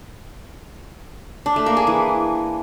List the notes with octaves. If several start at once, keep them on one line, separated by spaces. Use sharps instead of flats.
D4
A3
A#3
G#4
E3